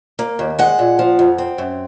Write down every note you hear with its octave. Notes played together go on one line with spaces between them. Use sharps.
A#3
D#2
G#3 F#5
A#2
F3
F2
C4
F#2